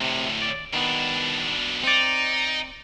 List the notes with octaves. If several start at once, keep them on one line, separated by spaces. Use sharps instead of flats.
D2 A2 C3
D5
B2 D#3 B3 D4
C4 D#4 D5